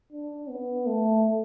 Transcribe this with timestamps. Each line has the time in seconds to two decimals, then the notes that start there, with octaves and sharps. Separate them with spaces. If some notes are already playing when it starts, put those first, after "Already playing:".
0.12 D4
0.49 B3
0.86 A3